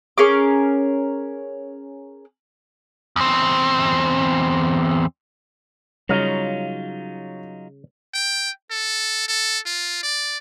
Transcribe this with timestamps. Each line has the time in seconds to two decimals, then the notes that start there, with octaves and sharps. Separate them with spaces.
0.18 C#4 G#4 A#4 D6
3.16 E2 C4
6.09 C#3 F#3 G3 D#4 F4 C#5 F5 A#5
8.14 G5
8.71 A4
9.28 A4
9.66 F4
10.03 D5